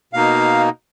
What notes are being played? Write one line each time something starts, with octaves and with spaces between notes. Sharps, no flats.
B2 A#3 D#4 F5